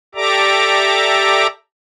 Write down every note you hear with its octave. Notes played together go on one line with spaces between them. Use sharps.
G4 A4 D5 E5 A#5 D6